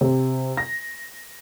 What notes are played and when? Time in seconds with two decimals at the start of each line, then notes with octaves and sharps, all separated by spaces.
0.01 C3
0.57 A#6